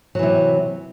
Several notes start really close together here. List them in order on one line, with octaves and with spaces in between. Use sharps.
F#3 E3 C3